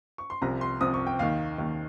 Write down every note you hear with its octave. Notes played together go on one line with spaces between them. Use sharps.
C#6
C6
C2 C3 F3 A#5
C6
C2 C3 F3 D#6
C#6
G5
D#2 D#3 F5
D#2 D#3